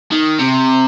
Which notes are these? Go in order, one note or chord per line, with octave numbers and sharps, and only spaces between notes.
D#3
C3